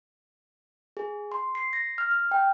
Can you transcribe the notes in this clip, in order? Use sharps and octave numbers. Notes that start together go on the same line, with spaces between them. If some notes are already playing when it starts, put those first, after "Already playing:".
G#4
C6
C7
A#6
F6
F6
G5